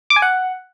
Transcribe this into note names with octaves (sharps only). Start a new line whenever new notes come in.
D6
G#5
F#5